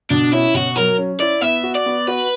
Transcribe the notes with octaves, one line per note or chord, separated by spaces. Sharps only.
B2 D4
C#4 E4
B2 F#4
F#3 A#4
C#4
E4 D5
B3 E5
F#4
D5
B3
F#4 B4